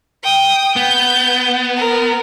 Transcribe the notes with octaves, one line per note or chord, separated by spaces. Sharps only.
G5 D#6
B3 G6
A#4